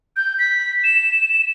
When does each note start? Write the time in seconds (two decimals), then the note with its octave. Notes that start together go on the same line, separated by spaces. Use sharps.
0.17 G6
0.39 B6
0.84 E7